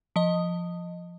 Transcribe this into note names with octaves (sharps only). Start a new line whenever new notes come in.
F3 D#5